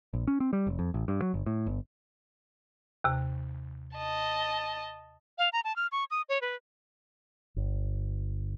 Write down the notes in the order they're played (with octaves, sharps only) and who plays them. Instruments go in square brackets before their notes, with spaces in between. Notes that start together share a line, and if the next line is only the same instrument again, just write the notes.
[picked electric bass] A#1
C#4
C4
G3
F1
F2
A1
G2
F#3
G1
A2
G1
[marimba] D#2 C3
[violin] D#5 A5
[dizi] F5
A#5
A5
F6
C#6
D#6
C#5
B4
[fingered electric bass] G1